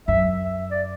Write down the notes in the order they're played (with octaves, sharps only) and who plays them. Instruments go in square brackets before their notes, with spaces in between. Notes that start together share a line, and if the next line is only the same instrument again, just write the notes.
[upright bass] F#2 [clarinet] E5
[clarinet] E5
D5